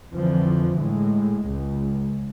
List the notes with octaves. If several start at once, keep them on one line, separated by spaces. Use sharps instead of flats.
F2 D3 E3 F3
A2 G#3
C#2